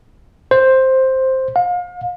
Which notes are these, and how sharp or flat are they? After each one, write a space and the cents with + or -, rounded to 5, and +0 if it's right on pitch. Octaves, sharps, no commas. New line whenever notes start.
C5 +5
F5 +35